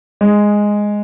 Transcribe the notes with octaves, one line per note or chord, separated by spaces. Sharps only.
G#3